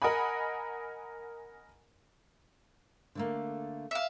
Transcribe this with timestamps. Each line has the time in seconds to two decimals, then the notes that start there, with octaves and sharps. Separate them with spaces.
0.02 A#4 D#5 F#5 G#5 B5
3.15 D3 A3 A#3
3.91 E5 F5